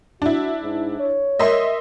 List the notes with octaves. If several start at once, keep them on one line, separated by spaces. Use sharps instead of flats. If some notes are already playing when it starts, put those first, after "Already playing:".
D4 E4 F#4
G#2
C#5
A#4 D#5 E5 C6